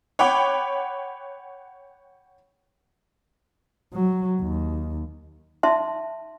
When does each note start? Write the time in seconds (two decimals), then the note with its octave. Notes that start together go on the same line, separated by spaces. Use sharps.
0.19 C#5 F#5 G5 B5 D6
3.94 F#3
4.41 D#2
5.63 D#4 E5 A5 C6